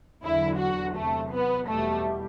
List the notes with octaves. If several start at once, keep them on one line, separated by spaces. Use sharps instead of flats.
E2 D3 F#3 E4
F#4
E2 C3 F#3 A3
B3
E2 B2 G3 A3